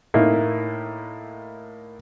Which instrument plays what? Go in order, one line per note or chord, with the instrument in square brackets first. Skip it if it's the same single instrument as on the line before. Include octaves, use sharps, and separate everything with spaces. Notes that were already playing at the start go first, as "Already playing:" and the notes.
[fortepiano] A2 A#3 D#4 E4